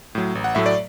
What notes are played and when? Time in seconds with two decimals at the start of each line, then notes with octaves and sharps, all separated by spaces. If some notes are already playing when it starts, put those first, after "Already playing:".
0.15 A2 F#3
0.35 A1
0.44 F#5
0.55 A2 F#3 A3 E5
0.66 D5